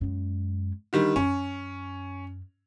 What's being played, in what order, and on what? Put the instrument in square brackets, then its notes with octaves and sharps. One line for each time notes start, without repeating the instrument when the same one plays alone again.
[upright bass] F#2 G#3
[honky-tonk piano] D3 D#3 G3
[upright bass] F#2 [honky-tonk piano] C#4